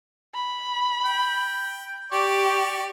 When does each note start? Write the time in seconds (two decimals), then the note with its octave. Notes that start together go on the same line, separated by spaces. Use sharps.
0.34 B5
1.05 G5
2.12 G4 D5 C#6